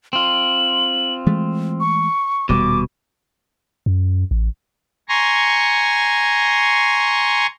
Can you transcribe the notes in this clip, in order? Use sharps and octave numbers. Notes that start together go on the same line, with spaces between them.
C4 F4 F#7
E3 G#3 A3
C#6
D#1 B2 G3 D6
F#2
A1
G#5 A#5 C6 C#6